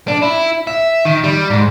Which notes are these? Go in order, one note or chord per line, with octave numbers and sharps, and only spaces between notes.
D4
E4
E5
D#3
G3
G#2